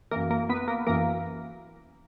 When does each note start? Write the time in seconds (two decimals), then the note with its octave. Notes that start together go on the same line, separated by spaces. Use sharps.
0.11 F#2 E3 A#3 A#4
0.31 A#3 A#4
0.49 B3 B4
0.68 A#3 A#4
0.87 F#2 E3 A#3 A#4